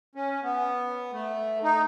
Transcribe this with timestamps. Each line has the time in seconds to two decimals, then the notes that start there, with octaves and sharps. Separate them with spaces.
0.15 C#4
0.43 B3
1.13 A3
1.63 D#4